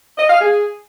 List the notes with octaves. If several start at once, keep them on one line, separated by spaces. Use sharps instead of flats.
D#5
F5
G#4